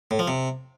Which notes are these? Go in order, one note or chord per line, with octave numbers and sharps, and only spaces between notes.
A2
F3
C3